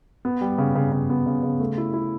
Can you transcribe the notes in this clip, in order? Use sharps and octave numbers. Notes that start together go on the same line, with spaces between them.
B3
G3
C#3
C#3
C#3
B3
C#3
C#3
A3
E4
E4